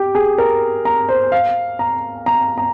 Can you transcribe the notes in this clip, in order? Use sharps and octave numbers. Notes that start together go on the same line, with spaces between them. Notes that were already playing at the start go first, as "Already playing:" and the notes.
Already playing: G4
G#4
A#4
A#5
C5
F5
A#5
A#5
A#5